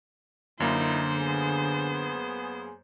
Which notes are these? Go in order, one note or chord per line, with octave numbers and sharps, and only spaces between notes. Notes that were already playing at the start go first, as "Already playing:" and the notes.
F#2 D3 A#3 D#4 E4 C5
B3 G#4